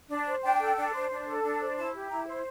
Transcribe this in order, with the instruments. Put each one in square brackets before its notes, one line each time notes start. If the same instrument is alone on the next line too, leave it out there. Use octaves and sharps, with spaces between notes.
[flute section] D4
C5
D4 G5
A4
D4
C5
D4
A4
D4
C5
E4 A5
G4
E4 A#5
C5